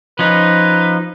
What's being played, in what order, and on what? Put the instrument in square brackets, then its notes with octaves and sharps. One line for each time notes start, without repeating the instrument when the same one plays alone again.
[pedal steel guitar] F3 C#4 D#4 [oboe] B4